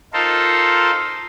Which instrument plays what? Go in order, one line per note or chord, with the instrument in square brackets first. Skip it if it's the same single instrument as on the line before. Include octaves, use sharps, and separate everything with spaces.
[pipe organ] D#4 F4 A4 A#4 C5